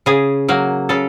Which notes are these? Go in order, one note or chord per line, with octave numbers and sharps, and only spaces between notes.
C#3 G#4
F#3 A#3
C#3 A4